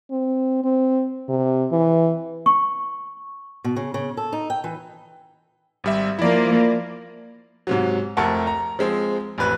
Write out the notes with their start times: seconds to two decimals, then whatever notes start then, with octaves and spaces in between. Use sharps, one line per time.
0.11 C4
0.64 C4
1.29 C3
1.72 E3
2.46 C#6
3.64 B2
3.76 C#3
3.94 C#3
4.17 A4
4.32 D#4
4.50 G5
4.64 E3
5.84 G#1 G3 E5
6.19 F3 A#3 E4 D5
7.67 G#2 C3 F#3
8.17 F1 F2 A3 A#4 F#5 A5
8.47 A#5
8.79 F3 G#3 C4
9.38 A1 F2 B4 F#6